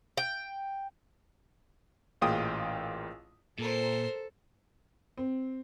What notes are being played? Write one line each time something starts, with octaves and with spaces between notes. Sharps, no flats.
G5
A1 A#2 F4 G#4 G5 D#6
A#2 A4 A#4 C5
C4